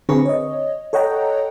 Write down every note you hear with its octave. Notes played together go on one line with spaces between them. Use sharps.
D3 C4 G#4 B4 A#5 C#6
C#5 D#5
A4 C#5 D#5 F#5 G5 A#5